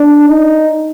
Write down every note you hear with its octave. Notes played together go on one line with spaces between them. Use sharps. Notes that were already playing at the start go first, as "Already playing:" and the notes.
Already playing: D4
D#4